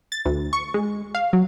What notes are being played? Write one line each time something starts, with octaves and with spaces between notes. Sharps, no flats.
A6
D2
C#6
G#3
F5
F#3